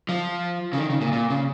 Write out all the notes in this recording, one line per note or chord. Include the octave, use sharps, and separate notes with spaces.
F3
C#3
D#3
C#3
A#2
A#2
C#3